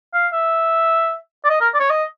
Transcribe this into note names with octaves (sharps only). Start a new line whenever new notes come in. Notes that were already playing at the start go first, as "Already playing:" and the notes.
F5
E5
D5
D#5
A#4
D5
C#5
D#5